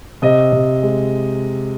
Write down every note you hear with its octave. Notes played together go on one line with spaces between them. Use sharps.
C3 D#5
C3
G#3